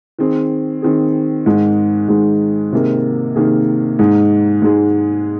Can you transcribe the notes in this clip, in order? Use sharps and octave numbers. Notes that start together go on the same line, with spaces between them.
D#3 C4 G#4
D#3 C4 G#4
G#2 D#3 G#3
G#2 D#3 G#3
C3 D#3 A#3 G#4
C3 D#3 A#3 G#4
G#2 G#3 D#4 G#4
G#2 G#3 D#4 G#4